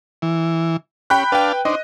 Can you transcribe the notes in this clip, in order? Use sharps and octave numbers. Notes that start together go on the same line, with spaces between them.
E3
C#4 G4 G5 B5 F#6
D4 B4 F5 G5 A5
D4 D#4 C5 D#5